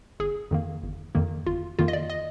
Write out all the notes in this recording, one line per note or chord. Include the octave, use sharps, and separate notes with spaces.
G1 G#4
F2 D#3 A#3
G1
F2 D#3 A#3
G1 F4
F2 D#3 A#3 F4
D#5
D5
D#5